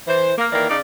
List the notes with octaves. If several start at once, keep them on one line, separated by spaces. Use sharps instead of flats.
E3 C5
A#3
D#3 E3 A#3 A#4 D5
C#3 D#4 D5